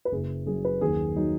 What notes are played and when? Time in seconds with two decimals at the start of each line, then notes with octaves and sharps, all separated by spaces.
0.05 B4
0.12 F#1 G#4
0.47 F#2 G#4
0.65 B4
0.81 D#2 G#4
1.16 F#3 D#4